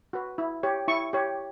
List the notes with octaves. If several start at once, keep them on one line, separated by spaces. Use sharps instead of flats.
F#4 B4
E4
G4 C#5
E4 C#6
G4 C#5